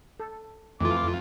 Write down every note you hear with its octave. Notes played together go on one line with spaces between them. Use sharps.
A4
F2 E3 A3 F4 D6